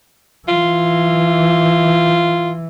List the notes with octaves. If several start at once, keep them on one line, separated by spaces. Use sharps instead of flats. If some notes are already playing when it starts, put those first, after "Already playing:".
E3 F4